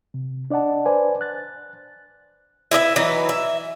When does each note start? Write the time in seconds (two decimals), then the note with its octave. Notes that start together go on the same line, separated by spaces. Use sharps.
0.14 C3
0.50 D4 D5 D#5 F#5 A5
0.86 B4 C5 D5 G#5
1.21 F#6 A6
2.71 E4 B4 D#5 E5
2.96 E3 F#3 D#4 B4
3.29 E5